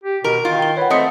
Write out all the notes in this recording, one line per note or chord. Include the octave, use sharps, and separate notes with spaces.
G4
B2 A#4
D#3 F4
G5 G7
B4 C#5 F#5
A3 C4 D#5 D#6 C#7